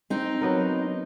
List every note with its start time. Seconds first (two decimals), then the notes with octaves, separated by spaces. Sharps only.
0.10 C4 D#4
0.41 F#3 B3 A#4